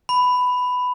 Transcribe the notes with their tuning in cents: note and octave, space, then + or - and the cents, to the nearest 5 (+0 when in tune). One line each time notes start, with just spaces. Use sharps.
B5 +10